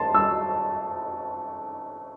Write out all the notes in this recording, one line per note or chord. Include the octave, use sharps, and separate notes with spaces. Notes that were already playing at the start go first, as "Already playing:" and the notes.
Already playing: A5 C6
E6